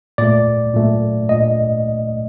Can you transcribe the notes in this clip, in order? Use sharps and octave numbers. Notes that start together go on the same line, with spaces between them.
A#2 A3 D5
A#2 A3
A#2 A3 D#5